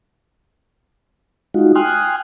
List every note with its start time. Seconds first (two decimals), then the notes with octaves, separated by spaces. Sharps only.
1.54 G#3 D#4 F4 F#4
1.75 G5 G#5 C6 D#6 F6 F#6